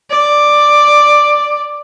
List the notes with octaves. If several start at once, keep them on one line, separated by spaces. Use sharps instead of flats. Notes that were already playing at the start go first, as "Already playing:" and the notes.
D5